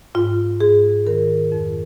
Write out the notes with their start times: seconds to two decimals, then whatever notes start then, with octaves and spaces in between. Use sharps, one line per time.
0.15 G#2 F4
0.60 G#2 G#4
1.06 D#3 A#4
1.52 F2